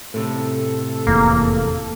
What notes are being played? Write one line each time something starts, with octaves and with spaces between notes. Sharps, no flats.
A2 C3 A4
F1 E2 A#3